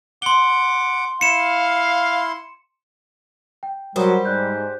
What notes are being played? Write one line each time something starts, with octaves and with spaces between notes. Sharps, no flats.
F#5 C6 D6 G7
E4 F5 C6 C#7 E7
G5
F#3 G3 G4 A#4 C5 F#5 D#6
G#2 D5 F#6 G6